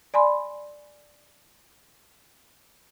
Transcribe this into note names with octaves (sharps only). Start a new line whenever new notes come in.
D5 G#5 B5 C6